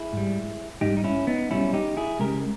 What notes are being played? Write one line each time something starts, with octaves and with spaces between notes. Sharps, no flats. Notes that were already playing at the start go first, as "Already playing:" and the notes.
Already playing: E4 G#4
G#2 G3
G#2 G3 D#4 G4
D#4
C#4 E4
B3 D#4
B1 B2 G3 C#4 E4
D#4 G4
E4 G#4
C#2 C#3 G#3 G4 A#4